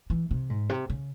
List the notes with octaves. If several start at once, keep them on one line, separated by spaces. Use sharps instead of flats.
E3
C3
G#2
C3
C#3